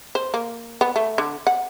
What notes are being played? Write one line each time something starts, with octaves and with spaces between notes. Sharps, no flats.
C5
A#3
B3
A3
D3
F#5